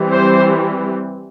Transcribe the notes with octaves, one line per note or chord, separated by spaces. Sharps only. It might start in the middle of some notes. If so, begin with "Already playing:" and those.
Already playing: E3 G3 C4
C5